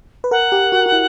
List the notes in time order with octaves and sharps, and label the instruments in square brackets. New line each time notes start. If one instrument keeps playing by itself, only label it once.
[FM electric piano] B4
[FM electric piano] A#4 [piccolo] F#5
[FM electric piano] G4
F#4
F#4
E4